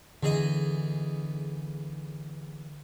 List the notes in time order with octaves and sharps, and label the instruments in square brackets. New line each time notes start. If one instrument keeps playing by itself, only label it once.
[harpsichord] E2 G#4 D#5 [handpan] D3